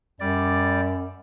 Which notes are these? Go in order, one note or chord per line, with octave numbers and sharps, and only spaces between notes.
F#2 G3 D5